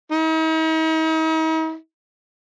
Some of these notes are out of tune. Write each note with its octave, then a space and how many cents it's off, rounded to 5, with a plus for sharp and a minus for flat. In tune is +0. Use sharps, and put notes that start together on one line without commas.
D#4 +45